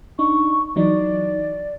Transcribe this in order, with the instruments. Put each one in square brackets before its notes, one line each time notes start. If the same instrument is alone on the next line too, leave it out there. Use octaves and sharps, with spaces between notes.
[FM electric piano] D4 D#4 [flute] C#6
[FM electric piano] E3 F#3 D#4 [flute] D5